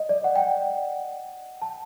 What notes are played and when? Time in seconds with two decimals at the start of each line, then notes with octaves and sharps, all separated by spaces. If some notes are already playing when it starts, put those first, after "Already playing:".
Already playing: D#5
0.09 D5
0.24 F#5
0.36 G5
0.39 F#5
1.62 A5